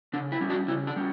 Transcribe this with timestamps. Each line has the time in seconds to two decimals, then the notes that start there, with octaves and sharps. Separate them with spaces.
0.13 C#3 D4
0.32 E4
0.41 G3 C#4
0.50 D4 F#4
0.68 C#3 E4
0.87 D4
0.96 G3 C#4